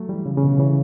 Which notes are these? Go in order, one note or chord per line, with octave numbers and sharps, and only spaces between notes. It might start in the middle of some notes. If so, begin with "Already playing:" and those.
Already playing: F#3 A3
E3 G3
C#3
C#3
B2 D3
C#3 E3